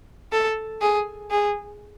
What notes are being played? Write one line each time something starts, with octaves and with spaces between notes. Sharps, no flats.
A4
G#4
G#4